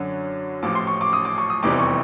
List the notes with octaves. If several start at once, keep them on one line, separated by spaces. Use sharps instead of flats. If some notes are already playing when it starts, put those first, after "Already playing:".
Already playing: F#2 D3 F#3
A1 A2 F3 D6
C6
C#6
D6
D#6
D6
C#6
D#6
F1 E2 C3 E3 G3 D6
C#6